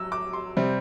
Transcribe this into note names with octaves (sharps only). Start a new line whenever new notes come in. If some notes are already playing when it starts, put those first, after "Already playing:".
Already playing: F#3 E6
D6
C6
C3 G3 C4